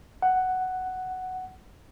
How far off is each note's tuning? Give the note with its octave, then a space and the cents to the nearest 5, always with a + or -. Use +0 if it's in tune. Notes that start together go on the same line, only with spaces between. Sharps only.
F#5 +5